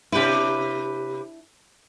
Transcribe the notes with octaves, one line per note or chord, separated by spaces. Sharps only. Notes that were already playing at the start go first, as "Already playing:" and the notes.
C3 D4 E4 G4 B4